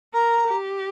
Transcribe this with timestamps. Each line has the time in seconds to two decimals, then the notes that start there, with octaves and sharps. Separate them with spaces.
0.14 A#4 A#5
0.48 G4